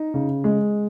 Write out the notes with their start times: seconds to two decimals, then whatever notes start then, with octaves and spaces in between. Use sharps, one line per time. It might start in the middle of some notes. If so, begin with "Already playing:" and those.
Already playing: D#4
0.14 C#3
0.44 G#3